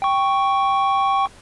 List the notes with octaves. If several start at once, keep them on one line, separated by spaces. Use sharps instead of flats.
G5 C#6